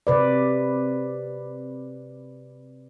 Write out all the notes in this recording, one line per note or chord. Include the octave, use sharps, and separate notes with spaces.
C3 B4 D5